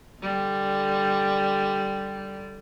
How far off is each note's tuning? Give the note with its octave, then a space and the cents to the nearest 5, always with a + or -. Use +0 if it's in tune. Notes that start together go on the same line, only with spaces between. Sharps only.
D3 +0 G3 +0